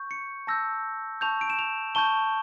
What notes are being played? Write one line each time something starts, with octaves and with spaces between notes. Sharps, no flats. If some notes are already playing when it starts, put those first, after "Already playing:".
Already playing: C#6 G6
C#7
A5 E6 G6 A#6
A5 C#6 G6 F7
D7
E7
F7
A5 C#6 G6 G7